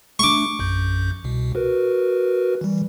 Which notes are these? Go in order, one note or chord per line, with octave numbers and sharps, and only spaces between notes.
A3 D4 C#6 D6
A#1 F#2 G6
C2 B2
F#4 A#4 B4
E3 G3